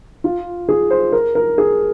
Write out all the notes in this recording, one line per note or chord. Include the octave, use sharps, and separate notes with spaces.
F4
G#4
C5
A#4
A#4
G#4